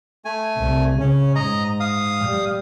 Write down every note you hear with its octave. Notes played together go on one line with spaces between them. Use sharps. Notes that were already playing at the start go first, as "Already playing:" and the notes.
A3 G#5
C2
C#3 C#4
G#2 D#5 A#5
F5 D#6
G3